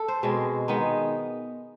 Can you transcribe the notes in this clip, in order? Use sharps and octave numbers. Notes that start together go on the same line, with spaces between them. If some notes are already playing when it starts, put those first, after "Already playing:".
Already playing: A4
C5
B2 G#3 C4
D#3 G#3 B3 D#4